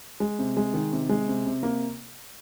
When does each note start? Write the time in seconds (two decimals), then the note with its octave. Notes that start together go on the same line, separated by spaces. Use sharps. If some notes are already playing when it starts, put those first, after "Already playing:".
0.20 G#3
0.39 C3
0.57 G#3
0.74 D#3
0.92 C3
1.09 G#3
1.28 C3
1.46 C3
1.63 A#3